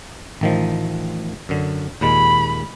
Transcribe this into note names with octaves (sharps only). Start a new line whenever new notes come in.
A1 D#3 F3
F#2 D3
D#2 A#2 G#3 B5